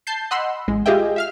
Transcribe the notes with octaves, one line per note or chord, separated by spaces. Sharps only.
A5 G6 C7
D#5 F#5 B5 C6 E6
A1 G#3
F4 G4 G#4 D#5 E5 G5
E5 F5 F6